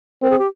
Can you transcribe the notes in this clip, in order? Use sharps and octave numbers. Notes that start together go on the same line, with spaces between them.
C4 A#4
G#4
G4